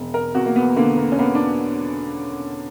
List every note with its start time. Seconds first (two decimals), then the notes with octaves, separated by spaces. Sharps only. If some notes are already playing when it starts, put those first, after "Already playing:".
Already playing: E1
0.14 A#4
0.35 E2 F#4
0.46 A#3
0.56 B3
0.77 D3 A#3
0.97 A#3
1.12 C#4
1.19 A#3 B3
1.35 D4